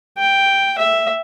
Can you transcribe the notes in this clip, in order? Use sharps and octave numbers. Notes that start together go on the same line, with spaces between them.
G5
E5